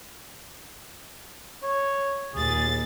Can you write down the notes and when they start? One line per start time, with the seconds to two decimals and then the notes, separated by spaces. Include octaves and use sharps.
1.63 C#5
2.35 D#2 A#2 G#4 A6